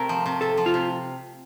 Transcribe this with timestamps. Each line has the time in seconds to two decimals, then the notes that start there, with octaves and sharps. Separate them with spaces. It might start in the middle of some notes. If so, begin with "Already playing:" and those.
Already playing: C3 A3 A#4
0.09 F3
0.26 C3
0.41 C3 A4
0.57 F3
0.66 F4
0.74 C3